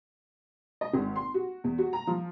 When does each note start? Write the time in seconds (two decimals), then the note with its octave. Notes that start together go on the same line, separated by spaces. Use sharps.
0.81 D#5
0.93 G#1
1.16 C6
1.34 F#4
1.64 E2
1.78 F#4
1.93 A#5
2.07 F3